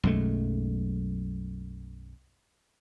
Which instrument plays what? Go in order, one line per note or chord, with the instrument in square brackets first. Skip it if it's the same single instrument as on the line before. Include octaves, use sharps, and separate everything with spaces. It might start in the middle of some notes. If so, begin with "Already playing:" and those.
[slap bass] B1 F#2 G#3 A3